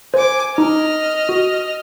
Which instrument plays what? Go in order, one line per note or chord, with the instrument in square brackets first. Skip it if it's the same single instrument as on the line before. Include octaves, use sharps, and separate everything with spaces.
[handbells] C5 [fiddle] G#5 D6
[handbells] D#4 A#5 [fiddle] D#5 F6
[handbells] F#4